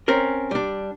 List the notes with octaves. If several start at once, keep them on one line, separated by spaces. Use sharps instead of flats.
C4 C#4 A#4
G3 D4